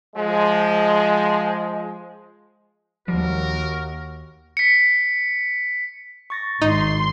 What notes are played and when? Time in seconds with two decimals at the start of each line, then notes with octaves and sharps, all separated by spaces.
0.16 F3 G#3
3.08 D#2 F3 G3 F#4 A#4
4.57 B6 C#7
6.30 C#6 A6 A#6
6.62 G#1 D#4 C6